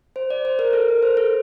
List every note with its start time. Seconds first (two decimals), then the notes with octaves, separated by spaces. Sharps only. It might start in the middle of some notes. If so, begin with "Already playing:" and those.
0.16 C5
0.30 D5
0.45 C5
0.59 A#4
0.73 A4
0.88 A#4
1.03 C5
1.17 A4